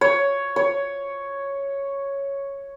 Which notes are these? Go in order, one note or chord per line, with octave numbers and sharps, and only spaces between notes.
C#5
C#5